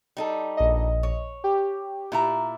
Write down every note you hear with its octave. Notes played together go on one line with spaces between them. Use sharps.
G3 D#4 A4
A#1 D#5
C#5
G4
A#2 E4 A#5